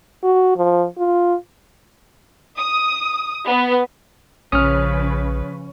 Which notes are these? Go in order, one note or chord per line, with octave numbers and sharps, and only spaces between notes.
F#4
F3
F4
D#6
B3
A#1 C#3 F3 C#4 B4 D#6 F6